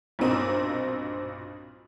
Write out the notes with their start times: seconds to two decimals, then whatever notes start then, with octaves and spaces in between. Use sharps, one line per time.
0.19 B1 G2 A#2 C4 D#4 A#4